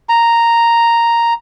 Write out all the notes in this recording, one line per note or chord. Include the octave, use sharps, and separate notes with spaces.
A#5